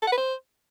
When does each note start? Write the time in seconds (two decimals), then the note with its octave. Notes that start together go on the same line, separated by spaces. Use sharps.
0.02 A4
0.07 F#5
0.12 B4
0.17 C5